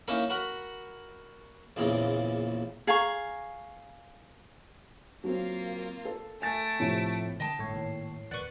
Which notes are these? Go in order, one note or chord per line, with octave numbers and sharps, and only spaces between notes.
A#3 C#4 D#4 E4 A#4 E5
F#4 A#4 B5
A#1 E2 A#2 C#3
G#4 F5 A#5 C#6
F#3 A#3 C4 F4
A4
A3 G#5 A6 D7
A2 C3 F3
D3 G#3 D#5 G5 A5
G1 A2 C#5 C7
G#2 D#3 A#3
D1 B4 D5 F#5 C#6